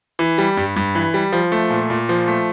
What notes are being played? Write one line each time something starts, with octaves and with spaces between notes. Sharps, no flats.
E3
G3
G2
G2
E3
G3
F3
A3
A#2
A#2
F3
A3